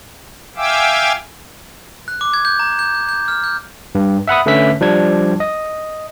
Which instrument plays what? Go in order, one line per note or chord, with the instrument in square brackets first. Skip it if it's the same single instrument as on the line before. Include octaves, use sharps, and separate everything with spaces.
[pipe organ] E5 F5 G5 G#5 D6 E6
[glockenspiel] F#6
D6
G#6
G6
A#5
G6
G6
G6
F6
G6
[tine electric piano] G2
E5 F#5 B5 D#6
D3 A3 C#4 B4 E5 B6
F3 G3 D4 G#6
D#5